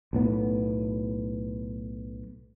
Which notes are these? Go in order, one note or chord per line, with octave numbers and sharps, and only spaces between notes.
B1 A2 B3